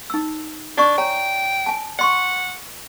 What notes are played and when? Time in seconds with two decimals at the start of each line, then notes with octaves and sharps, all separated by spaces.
0.10 D#4 E6
0.77 D4 D5 D#5 C#6
0.98 C#5 G5 G#5 A#5
1.66 G#5 A5
1.99 D#5 F#5 C6 C#6